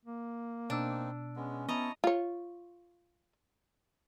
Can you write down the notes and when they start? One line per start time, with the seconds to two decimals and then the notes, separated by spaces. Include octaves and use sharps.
0.05 A#3
0.70 B2 C4 D4 D#4 E6
1.36 G#3 B3 C#4
1.69 B3 E4 D#5 A5 A#5 C#6
2.04 F4 C#5